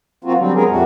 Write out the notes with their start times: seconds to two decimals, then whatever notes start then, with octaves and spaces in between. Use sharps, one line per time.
0.24 F3 A#3 C4 F4 F#4
0.38 D3 F#3 G3 C4
0.53 F#3 G#3 B3 C4 G#4 A#4
0.66 F2 A#2 G3 A3 F#4